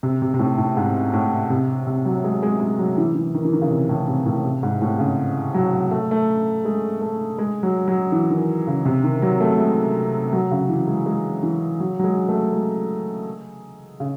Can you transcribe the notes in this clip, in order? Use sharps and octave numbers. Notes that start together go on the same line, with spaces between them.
C3
C3
C3
A2
A2
G#2
A2
C3
C3
F#3
G#3
G#3
G#3
F#3
E3
E3
D#3
E3
D#3
C#3
C3
A2
C3
A2
C3
G#2
A2
C#3
F#3
A3
A3
G#3
A3
G#3
F#3
F#3
E3
D#3
C#3
C3
D#3
F#3
A3
G#3
F#3
C#3
E3
G#3
G#3
E3
F#3
F#3
G#3
A3
G#3
C#3